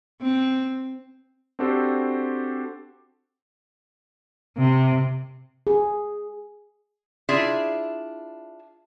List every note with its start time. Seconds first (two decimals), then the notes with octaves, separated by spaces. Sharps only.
0.21 C4
1.59 C4 D4 F#4 G4 A4 C5
4.58 C3
5.67 G#4
7.29 D4 E4 F4 G#4 E5